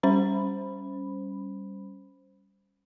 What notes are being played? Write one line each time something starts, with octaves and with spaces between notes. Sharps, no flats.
G3 C#4 C5 B5